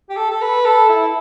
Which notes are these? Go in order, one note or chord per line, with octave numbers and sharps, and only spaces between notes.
G4
A4
A4
B4
A4
E4